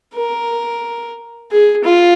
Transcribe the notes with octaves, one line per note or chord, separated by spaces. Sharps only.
A#4
G#4
F4